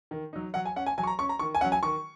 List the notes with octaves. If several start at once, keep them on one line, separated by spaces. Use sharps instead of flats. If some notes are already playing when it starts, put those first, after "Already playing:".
D#3
F#3 D#4
F#3 F#5
G#5
C#4 F#5
G#5
F#3 G#5
C#6
A#5
C#4 C#6
A#5
D#3 C#6
G#5
F#3 C#4 F#5
G#5
D#3 C#6